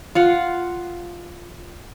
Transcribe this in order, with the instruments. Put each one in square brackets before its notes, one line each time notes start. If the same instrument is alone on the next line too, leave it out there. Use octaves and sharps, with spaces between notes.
[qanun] F4 F5 F#5